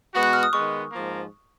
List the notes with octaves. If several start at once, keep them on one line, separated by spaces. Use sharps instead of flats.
B2 G#3 B3 F#4
F#6
F6
D#6
D#3 G#3 B3 C#6
G#2 F3 A#3